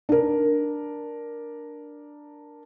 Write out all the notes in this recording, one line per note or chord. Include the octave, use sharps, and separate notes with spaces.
D4 A#4